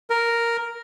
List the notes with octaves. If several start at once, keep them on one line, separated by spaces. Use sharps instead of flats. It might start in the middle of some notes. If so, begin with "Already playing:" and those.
A#4